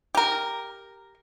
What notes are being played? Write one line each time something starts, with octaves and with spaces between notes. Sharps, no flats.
G4 A#4